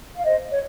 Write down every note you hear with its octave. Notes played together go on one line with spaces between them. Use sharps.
F5
C5 D#5
C#5